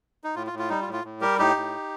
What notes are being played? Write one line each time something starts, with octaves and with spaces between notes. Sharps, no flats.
D#4
A2 F4
F4
A2
F4
G3 D#4
F4
A2
F4
A2
G3 G4 A#4
A2 D#4 G4
A2